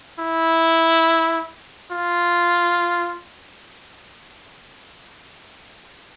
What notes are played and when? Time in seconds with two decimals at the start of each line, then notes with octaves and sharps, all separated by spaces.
0.19 E4
1.91 F4